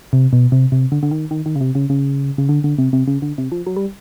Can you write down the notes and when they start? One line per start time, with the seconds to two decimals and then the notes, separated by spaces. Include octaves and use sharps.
0.13 C3
0.33 B2
0.52 C3
0.72 C3
0.92 D3
1.03 D3
1.11 D#3
1.31 D#3
1.46 D#3
1.56 C#3
1.61 C3
1.75 C#3
1.90 C#3
2.38 C#3
2.49 D3
2.64 D3
2.78 C3
2.93 C3
3.07 C#3
3.22 D3
3.38 C3
3.52 F3
3.67 F#3
3.76 G3